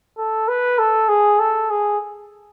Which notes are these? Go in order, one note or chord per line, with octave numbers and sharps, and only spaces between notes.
A4
B4
A4
G#4
A4
G#4